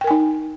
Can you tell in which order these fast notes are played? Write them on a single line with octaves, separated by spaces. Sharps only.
G5 A#4 G#5 D#4